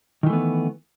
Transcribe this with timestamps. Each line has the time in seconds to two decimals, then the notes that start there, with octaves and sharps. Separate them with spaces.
0.23 D#3
0.26 E3
0.30 A3
0.33 B3